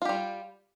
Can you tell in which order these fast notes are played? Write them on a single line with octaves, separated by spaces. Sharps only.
F4 G4 G3